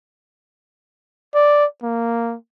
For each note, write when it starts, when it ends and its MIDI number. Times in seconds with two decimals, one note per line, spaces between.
1.35 1.65 74
1.83 2.36 58